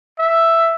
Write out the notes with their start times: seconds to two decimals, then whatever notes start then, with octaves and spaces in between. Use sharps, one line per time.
0.19 E5